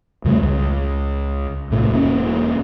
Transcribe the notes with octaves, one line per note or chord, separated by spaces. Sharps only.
F2 C#3 G3 A3
C#2
B1 A2 C3
E1 A#3 C#4